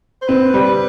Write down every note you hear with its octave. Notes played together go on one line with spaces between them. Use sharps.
C5
C4 B4
G3